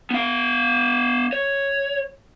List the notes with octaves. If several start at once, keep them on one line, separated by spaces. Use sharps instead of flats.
B3 F5
C#5